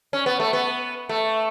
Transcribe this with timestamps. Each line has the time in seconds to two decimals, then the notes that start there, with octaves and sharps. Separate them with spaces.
0.13 C#4
0.26 B3
0.40 A3
0.53 B3
1.09 A3